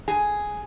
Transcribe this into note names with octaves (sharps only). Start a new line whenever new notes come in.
G#4